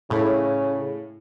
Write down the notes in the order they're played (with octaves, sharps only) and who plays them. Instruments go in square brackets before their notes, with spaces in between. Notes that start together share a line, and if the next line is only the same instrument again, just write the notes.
[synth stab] A2 [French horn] C#3